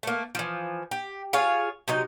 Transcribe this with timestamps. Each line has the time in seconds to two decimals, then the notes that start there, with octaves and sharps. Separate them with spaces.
0.03 A3 A#3
0.35 E3 F3
0.91 G4
1.33 F4 G#4 C#5 F5
1.88 C3 F#3 D#4 D#5